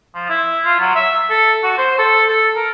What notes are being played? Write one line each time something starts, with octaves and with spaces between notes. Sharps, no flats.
F3
E4
F4
F#3
E5
A4
F#4
C5
A4
A4
A#4